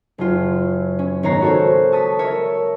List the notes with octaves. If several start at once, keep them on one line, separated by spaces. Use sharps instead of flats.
F#1 F#2 F4
C#4
G#1 B3 C#5 A#5 A6 C7
F#4 A4 C5 C#5
A5 C#6 D#6 A6 B6
A#4 C#5 E5